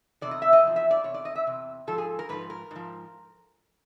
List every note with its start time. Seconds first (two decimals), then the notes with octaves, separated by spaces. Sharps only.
0.21 E2 C3 D5
0.31 D#5
0.42 E5
0.53 D#5
0.63 E2 C3 F3
0.76 E5
0.91 D5
1.04 E2 C3 C#5
1.14 D5
1.25 D#5
1.35 E5
1.46 E2 C3
1.87 G#2 F3 A4
1.98 G#4
2.19 A#4
2.29 G#2 F3 B4
2.50 A#4
2.71 G#2 F3